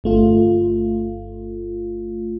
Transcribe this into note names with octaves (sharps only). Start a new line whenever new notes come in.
G1 A3 F4